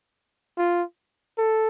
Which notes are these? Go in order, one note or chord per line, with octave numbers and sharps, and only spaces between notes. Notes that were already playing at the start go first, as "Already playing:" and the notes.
F4
A4